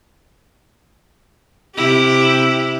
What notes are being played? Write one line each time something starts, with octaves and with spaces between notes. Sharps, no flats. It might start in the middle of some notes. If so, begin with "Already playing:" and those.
C3 E4 G4